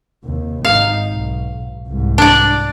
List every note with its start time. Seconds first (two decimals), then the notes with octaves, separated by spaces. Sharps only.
0.24 D#2 C3
0.65 G#1 D#4 F5
1.12 B1
1.88 C2 G#2
2.18 D4 D5